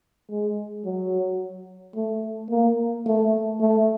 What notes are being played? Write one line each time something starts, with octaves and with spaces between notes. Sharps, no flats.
G#3
F#3
A3
A#3
A3
A3